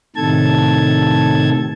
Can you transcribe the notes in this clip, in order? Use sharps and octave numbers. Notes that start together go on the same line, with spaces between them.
A2 C3 D#3 A4 A5 G#6